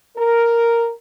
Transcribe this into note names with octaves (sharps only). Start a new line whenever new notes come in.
A#4